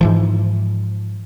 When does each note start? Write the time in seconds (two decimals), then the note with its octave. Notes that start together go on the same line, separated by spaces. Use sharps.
0.01 G#2 E3 F3